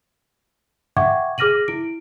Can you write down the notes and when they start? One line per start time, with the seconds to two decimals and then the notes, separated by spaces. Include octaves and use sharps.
0.97 E5 F#5 G5 C#6 D6 G#6
1.38 G#4 D6 F6 A#6 D#7 F#7
1.68 E4 D7